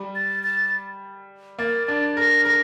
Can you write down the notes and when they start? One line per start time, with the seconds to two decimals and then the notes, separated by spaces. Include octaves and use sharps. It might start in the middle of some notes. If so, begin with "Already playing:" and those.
Already playing: G3
0.15 A6
0.43 A6
1.59 A#3 A6
1.88 D4 A6
2.17 A#4 A#6
2.45 A#4 A#6